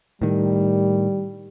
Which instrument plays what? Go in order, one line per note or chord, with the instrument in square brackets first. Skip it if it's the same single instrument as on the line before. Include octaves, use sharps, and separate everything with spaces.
[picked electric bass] A2 D#3 [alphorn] G3